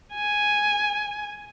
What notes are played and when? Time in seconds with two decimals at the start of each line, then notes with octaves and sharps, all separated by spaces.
0.14 G#5